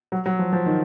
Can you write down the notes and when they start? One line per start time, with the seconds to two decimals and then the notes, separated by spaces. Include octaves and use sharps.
0.12 F#3
0.26 F#3
0.39 F3
0.53 F3
0.66 D#3